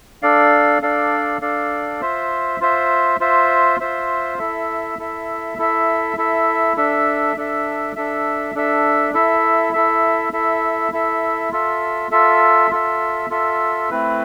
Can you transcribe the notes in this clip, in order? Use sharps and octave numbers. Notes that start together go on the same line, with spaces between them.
D4 A4 D5 F5
D4 A4 D5 F5
D4 A4 D5 F5
F4 C5 E5
F4 C5 E5
F4 C5 E5
F4 C5 E5
E4 A4 E5
E4 A4 E5
E4 A4 E5
E4 A4 E5
D4 A4 E5
D4 A4 E5
D4 A4 E5
D4 A4 E5
E4 A4 E5
E4 A4 E5
E4 A4 E5
E4 A4 E5
F4 A4 E5
F4 A4 E5
F4 A4 E5
F4 A4 E5
A3 C4 E4 B4